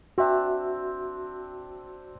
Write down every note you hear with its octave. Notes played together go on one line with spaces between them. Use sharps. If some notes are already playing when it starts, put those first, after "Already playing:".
C4 D4 F#4 E5